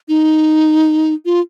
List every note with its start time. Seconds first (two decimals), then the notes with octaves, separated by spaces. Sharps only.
0.09 D#4
1.25 F4